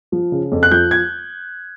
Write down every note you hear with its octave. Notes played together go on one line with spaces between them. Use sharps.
F3
C#3
F2
F#6
F3 G6
G#6